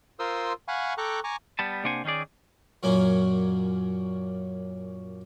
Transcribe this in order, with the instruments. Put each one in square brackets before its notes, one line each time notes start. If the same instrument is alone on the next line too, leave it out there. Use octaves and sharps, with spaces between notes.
[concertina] F4 A#4 C5 C6 D#6 E6
F5 F#5 G#5 B5 C#6
A4 G5 A#5 C#6 D6 F#6
G#5 A#5 C#6 D6
[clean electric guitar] G3 B3 A5
C3 A#3 D4 C5 F#5 G#5
D#3 C#4 D#4 G#4 D5
[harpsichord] F#2 A#2 F#3 A#3 C#4